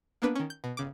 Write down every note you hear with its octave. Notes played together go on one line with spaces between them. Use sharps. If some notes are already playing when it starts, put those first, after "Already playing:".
A#3 B3 D4 B4
D#3 C#4
G6
B2
G1 C#3 D6